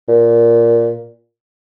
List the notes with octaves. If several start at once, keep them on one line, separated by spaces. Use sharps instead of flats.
A#2